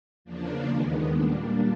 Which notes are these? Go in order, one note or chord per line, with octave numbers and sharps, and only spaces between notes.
E2 C#3 F3 A#3 D4
D#2 D#3 G#3 B3
A#2 G3 A#3 D4